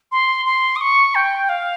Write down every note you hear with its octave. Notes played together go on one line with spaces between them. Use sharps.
C6
C6
D#6
C#6
G5
F5